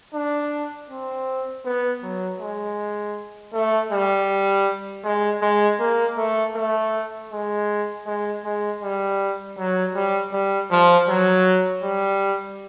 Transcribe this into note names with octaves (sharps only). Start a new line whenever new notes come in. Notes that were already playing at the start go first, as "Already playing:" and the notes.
D4
C4
B3
F#3
G#3
A3
G3
G#3
G#3
A#3
A3
A3
G#3
G#3
G#3
G3
F#3
G3
G3
F3
F#3
G3